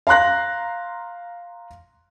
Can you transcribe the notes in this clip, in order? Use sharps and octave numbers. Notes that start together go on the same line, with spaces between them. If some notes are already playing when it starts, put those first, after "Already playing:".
F5 A#5 C6 F#6 A#6